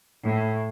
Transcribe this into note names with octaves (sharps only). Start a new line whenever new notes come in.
A2